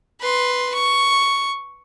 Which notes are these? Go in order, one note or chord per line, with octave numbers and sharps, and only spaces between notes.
B4 C6
C#6